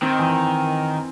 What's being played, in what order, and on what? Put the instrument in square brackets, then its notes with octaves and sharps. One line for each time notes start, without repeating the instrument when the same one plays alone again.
[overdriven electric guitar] D#3 [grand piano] C4
[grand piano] E3